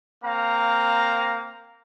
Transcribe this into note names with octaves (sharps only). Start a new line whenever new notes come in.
A#3 C4 F5 A#5